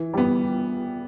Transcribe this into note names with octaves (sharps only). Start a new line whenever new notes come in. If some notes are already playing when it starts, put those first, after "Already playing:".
Already playing: E3
G3 B3